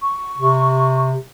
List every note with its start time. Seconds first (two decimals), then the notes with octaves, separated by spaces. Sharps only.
0.02 C#6
0.38 C3